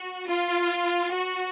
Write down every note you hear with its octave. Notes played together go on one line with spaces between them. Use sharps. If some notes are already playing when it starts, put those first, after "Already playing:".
Already playing: F#4
F4
F#4